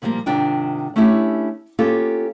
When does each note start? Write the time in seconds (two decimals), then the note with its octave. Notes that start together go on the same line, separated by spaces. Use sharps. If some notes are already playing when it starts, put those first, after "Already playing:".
0.02 A#2 D3 F3 G3 A#3
0.26 G#2 C3 D#3 D4 F4 G5
0.96 A3 C#4 D4 E4 G4
1.79 A#3 B3 C#4 F4 G4 A4